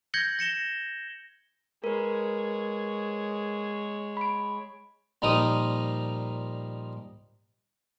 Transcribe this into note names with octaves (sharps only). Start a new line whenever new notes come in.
G6 G#6 A#6 C#7 F#7 G7
A#6 C#7 E7 G7
G#3 A#4 B4 C#5
B5 D7
A#2 F3 G3 D#4 A#4 D#6